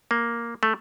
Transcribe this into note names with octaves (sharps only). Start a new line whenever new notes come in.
A#3
A3